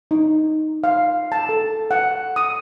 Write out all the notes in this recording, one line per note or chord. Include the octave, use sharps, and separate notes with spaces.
D#4
F5
A5
A4
F#5
D#6